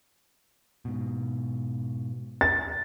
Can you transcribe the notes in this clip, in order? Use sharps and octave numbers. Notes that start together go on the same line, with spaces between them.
G#2 B2
A6